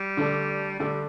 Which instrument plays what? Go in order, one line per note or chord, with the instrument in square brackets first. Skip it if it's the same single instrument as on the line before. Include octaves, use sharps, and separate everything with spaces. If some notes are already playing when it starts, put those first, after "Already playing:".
Already playing: [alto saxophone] G3
[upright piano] D3 A3 D4 A4
[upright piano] D3 A3 D4 A4 [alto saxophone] G3